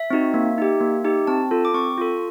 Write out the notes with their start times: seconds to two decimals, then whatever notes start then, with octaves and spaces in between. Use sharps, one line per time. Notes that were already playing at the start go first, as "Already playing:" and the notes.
Already playing: E5
0.10 C4 D#4 F#4
0.34 A#3
0.58 D#4 G4
0.81 A#3
1.04 D#4 G4
1.27 C4 A5
1.51 F4 A4
1.65 D6
1.74 C4 C#6
1.97 F4 A4